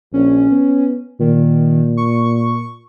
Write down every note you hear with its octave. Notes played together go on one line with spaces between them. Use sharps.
A#1 C#4
B3
A#2 D#3
C#6